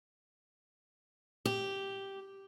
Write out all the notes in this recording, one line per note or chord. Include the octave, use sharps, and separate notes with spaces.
G4